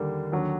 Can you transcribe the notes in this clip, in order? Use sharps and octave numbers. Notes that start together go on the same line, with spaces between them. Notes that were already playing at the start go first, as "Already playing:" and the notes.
Already playing: D#2 D3 G3 A#3 D4
D#2 D3 F#3